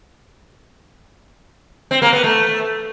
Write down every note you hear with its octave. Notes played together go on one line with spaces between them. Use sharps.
C4
A#3
B3
A3